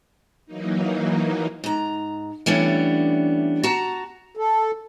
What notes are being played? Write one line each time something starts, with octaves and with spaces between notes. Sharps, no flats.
E3 F#3 A#3 D#4
G#2 A#5
E3 G3 A3 B3 C#4 D4
F#4 A5 A#5
A4